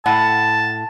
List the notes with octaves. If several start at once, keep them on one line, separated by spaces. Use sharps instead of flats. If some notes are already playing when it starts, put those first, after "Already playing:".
A2 F#5 A5